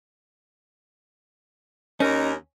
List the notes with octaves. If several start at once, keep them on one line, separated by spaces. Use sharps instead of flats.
D#2 C#4 D#4 A#4